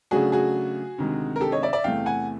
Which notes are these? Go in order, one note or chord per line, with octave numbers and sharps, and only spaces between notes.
C#3 F#3 A3 D4 F#4 G#4
F#4 G#4
D2 C3 D#3 G#3
A#4
G4 A4
C#5 D#5
D5 E5
D5 E5
E2 C3 E3 A3 F5 G5
F#5 G#5